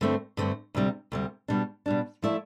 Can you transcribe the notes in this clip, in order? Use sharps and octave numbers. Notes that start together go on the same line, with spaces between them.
G2 D3 A3 C4
G2 D3 A3 C4
D2 C3 G3
D2 C3 G3
B2 G3 D4
B2 G3 D4
F3 A3 E4 A4 D5